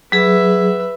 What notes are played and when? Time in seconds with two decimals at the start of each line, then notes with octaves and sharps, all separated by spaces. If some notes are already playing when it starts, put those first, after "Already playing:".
0.12 F#3 G#4 B4 E5